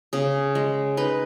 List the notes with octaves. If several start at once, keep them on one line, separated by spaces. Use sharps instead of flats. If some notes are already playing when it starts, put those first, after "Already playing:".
C#3 G#4
G#3
D#4 B4